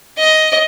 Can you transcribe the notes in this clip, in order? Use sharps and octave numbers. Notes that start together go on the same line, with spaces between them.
D#5